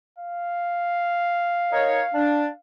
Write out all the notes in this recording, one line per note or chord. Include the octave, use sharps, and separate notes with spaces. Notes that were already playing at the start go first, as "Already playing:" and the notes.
F5
D#4 A#4 C#5
D4